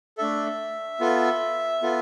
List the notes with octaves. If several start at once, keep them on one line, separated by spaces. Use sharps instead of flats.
A3 D4 A4 E5
B3 F4 A4
B3 F4 A4